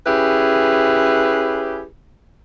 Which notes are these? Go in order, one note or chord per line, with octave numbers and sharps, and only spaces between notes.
C#4 E4 G4 G#4 B4